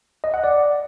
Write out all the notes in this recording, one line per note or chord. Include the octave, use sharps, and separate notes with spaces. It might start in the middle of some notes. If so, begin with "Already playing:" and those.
D#5
F#5
D5